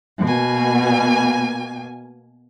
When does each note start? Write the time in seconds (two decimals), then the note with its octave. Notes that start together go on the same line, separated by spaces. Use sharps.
0.24 B2 A#3 G#5